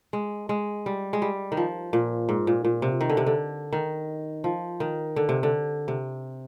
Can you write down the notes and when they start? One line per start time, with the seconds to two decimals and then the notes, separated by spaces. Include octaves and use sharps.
0.13 G#3
0.49 G#3
0.86 G3
1.13 G#3
1.22 G3
1.52 D#3
1.57 F3
1.93 A#2
2.29 G#2
2.47 A#2
2.65 A#2
2.82 C3
3.01 D#3
3.10 D3
3.17 C3
3.26 D3
3.73 D#3
4.44 F3
4.80 D#3
5.16 D3
5.29 C3
5.43 D3
5.88 C3